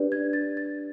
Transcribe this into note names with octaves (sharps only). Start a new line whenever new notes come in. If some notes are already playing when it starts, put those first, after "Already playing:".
Already playing: D4 G4 B4 D5
G#6
A6
A6